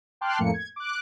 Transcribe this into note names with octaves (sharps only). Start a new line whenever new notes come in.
G5 A5 C6 D6 F6 F#6
F2 A2 A3 A#3 C#7
G#6
D6 F#6